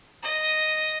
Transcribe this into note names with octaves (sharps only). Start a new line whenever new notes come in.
D#5